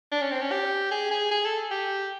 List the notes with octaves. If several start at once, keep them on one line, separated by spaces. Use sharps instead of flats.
D4
C#4
C4
C#4
G4
G#4
G#4
G#4
A4
G4